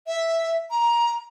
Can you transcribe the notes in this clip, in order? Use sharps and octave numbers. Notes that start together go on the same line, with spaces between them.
E5
A#5